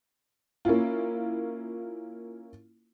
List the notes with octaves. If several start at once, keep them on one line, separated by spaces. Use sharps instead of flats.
A#3 C#4 E4 F4